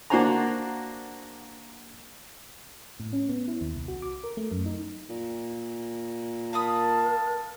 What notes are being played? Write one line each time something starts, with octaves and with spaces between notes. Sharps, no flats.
A#3 D4 F#4 C5 G#5 A#5
A2
C#4
B3
E4
D#2
C2
F#4
D6
A#4
A3
F#2
D#4
A#2
A#4 F5 A5 B5 D#6